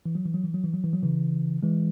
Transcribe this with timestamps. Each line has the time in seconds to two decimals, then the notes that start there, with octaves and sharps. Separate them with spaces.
0.06 E3
0.15 F#3
0.25 E3
0.34 F#3
0.44 E3
0.54 F#3
0.64 E3
0.74 F#3
0.84 E3
0.93 F#3
1.03 C#3 E3
1.63 E3 G#3